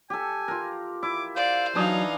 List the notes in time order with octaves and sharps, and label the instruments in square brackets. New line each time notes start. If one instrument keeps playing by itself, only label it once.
[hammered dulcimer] G4 A4 [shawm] G#5
[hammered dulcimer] F4 A#4
[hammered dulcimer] E4 [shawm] D6
[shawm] C5 [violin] D5 [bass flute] F5
[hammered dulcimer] E3 D4 G#4 [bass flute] F#3 [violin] D#4 F5